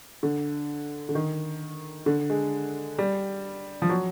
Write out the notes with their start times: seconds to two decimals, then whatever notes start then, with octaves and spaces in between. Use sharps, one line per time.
0.23 D3
1.09 D3
1.15 D#3
2.06 D3
2.30 G#3
2.99 G3
3.82 F3
3.90 F#3